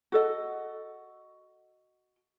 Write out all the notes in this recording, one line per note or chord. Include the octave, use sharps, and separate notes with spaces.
F#4 A4 D#5